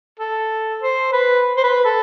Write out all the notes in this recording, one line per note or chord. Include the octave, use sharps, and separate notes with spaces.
A4
C5
B4
C5
B4
A4